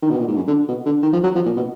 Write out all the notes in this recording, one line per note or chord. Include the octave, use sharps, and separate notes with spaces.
D#3
B2
A#2
G#2
F#2
D3
B2
D3
D#3
F3
F#3
F3
A#2
B2